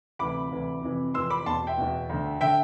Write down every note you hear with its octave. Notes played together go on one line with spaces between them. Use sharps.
D2 C3 E3 B5 D6
D2 C3 E3
F2 C3 E3
F2 C3 E3 C6 E6
B5 D6
E2 B2 A5 C6
E5 G5
E2 B2
D2 D3
D3 E5 G5